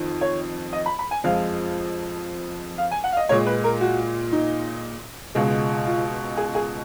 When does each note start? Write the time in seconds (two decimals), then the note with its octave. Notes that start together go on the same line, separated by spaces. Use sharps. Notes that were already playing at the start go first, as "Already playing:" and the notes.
Already playing: F2 D#3
0.21 C#5
0.73 D#5
0.86 B5
0.99 B5
1.11 G#5
1.24 F2 F3 G#3 F5
2.78 F5
2.91 G#5
3.04 F#5
3.12 F5
3.17 D#5
3.29 A#2 G#3 C#5
3.46 B4
3.64 A#4
3.81 F#4
4.33 D#4
5.35 C#2 B2 G#3
5.86 F4
6.37 G#4
6.55 G#4